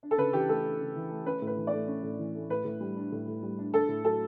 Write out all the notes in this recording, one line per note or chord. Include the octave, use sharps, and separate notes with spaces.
D4
A4
C#3 B4
E3 G4
A3 A4
D4
C#3
E3
A3
C#4 B4
A2
B4
E3
D5
A3
C#4
A2
E3
A3
A2 B4
A2
G3
D4
A2
A2
G3
D4
D4 A4
A2
F#3 A4